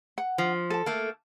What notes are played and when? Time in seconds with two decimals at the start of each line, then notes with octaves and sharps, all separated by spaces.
0.18 F#5
0.38 F3
0.70 A4 A5
0.86 A3 A#3